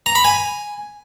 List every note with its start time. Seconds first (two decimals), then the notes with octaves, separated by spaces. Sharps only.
0.06 A#5
0.15 B5
0.24 G#5